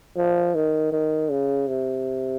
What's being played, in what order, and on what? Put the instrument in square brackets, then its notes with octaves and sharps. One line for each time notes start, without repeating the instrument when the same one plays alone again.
[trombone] F3
D#3
D#3
C#3
C3